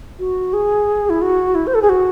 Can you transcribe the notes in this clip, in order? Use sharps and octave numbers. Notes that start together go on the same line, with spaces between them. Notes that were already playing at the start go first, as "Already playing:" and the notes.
F#4
G#4
E4
F#4
E4
C5
A4
G#4
F#4